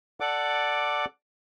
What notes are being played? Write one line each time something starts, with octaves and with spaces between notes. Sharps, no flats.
A4 D5 F#5 D6